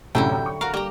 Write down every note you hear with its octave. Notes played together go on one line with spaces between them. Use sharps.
C2 F#2 A2 D3 F#3 E4 G5
C#6
F#4 A#4 F5
G3 A#3 G4 A#5